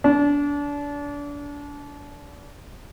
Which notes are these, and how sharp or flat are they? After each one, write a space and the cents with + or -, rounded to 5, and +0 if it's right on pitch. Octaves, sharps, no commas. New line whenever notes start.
D4 -30